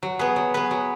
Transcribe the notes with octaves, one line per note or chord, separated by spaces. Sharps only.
F#3
B3 G#4 B4
F#3
B3 G#4 B4
F#3